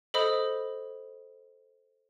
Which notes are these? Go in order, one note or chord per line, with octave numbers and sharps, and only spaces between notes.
A4 C5 D#5 B5 D#6